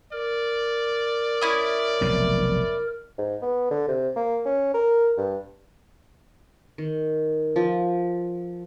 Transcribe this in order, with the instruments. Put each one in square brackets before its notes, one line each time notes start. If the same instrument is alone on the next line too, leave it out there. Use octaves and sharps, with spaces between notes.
[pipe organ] A#4 [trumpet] D5
[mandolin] C#4 E4 D#6
[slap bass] F1 B1 B2
[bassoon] G#2
B3
D3
C3
A#3
C#4
A#4
G2
[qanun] D#3
F3